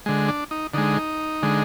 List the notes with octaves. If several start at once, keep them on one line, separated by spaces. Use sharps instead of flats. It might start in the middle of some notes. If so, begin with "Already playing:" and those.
D3 G#3
D4
D#4
D3 G#3 D#4
D3 G#3